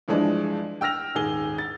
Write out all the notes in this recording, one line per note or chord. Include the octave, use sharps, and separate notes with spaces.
G2 E3 F3 G#3 D4
G5 E6 F6 A#6 F7
D#1 G#2 G#4 G7
A6